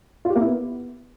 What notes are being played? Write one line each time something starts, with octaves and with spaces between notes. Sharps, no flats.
F4
G4
A#3
E4
B3